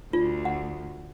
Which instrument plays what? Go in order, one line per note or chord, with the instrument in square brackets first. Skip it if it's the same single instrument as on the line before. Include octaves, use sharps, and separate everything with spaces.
[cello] D2 [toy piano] F4
[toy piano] F#5